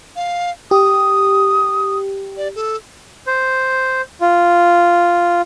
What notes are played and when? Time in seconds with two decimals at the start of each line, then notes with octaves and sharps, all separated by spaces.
0.16 F5
0.71 G4 D#6
2.37 D5
2.56 A4
3.27 C5
4.21 F4